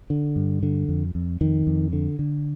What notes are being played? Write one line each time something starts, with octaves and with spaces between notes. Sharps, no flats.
D3
G2
D3
F2
F2
F2 D#3
F2
D3
D3